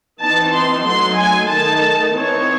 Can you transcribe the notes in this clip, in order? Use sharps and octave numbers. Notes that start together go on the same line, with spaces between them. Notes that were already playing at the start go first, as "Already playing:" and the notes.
E3 C4 D#4 A5
C6
F#3 A3 D#4 C6
G#5
D#3 A3 D#4 A5
E3 C4 D#4 C#5